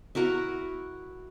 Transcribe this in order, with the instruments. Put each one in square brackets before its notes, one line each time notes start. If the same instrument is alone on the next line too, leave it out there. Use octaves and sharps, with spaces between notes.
[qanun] E4 F#4 A#4 F#5